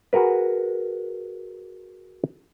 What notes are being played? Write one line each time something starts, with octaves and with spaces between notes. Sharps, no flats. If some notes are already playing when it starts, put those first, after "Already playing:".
F#4 G#4 A#4 B4